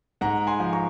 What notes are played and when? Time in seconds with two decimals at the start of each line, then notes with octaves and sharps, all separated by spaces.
0.21 G#2 F#5 A#5
0.47 G#5 C6
0.60 F3
0.73 A#5 C#6